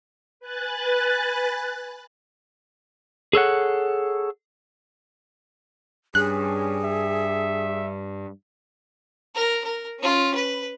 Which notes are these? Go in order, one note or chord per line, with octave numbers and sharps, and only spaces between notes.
B4 G#5 F#6 A6
G#4 A4 C#5 F#5
G2 C#4 G#4 F#6
E5
A#4
A#4
C#4 F4
B4